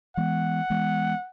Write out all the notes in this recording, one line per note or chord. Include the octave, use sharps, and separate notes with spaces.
E3 G#3 B3 F#5
E3 G#3 B3